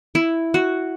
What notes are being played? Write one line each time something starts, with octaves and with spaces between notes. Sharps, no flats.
E4
F#4